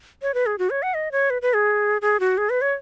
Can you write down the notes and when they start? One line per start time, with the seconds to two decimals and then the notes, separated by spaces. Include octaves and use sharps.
0.22 C#5
0.34 B4
0.46 G#4
0.59 F#4
0.70 C#5
0.83 F#5
0.94 D#5
1.12 C#5
1.30 B4
1.42 B4
1.54 G#4
2.02 G#4
2.20 F#4
2.38 G#4
2.50 B4
2.61 C#5